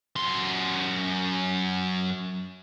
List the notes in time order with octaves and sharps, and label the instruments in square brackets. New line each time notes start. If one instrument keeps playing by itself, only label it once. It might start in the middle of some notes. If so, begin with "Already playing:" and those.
[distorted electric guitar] F#2 C6